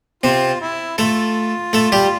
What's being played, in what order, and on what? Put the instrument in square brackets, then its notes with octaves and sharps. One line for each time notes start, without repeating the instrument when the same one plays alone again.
[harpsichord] C3 C4 [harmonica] F4
[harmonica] E4
[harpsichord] A3 A4 [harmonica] F4
[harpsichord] A3 A4
G3 G4